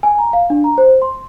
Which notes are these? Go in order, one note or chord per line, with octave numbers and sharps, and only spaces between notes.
G#5
A#5
F5
D4
A#5
C5
C6